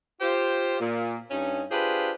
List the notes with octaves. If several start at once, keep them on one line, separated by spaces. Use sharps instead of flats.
F4 G4 C5
A#2
G2 C#4 D#4
D4 F4 G4 G#4 B4 C5